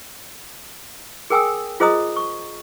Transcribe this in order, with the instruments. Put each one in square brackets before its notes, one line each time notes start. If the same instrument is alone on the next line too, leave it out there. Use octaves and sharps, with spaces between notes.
[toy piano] G#4 A#4 G5 G#5 D#6 E6
F4 G#4 C5 D#5 A#5 D#6
C#6